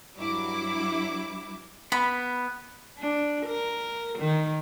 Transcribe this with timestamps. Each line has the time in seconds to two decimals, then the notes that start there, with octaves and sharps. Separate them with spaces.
0.18 G2 F#3 E4 D6
1.92 B3 B5
2.99 D4
3.46 A#4
4.18 D#3